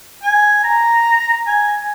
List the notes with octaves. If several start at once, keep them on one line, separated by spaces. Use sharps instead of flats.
G#5
A#5
G#5